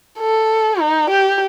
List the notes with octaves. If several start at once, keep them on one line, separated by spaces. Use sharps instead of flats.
A4
D#4
G4